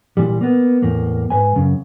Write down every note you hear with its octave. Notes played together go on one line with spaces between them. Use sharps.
A#2 E3 G3
A#3 B3
E2 A2 A#3
G#2 B4 G#5
F#2 C#3